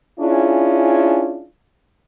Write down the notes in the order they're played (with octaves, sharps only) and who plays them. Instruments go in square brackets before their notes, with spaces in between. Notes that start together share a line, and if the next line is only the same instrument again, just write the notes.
[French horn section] C#4 D4 E4 F4 G#4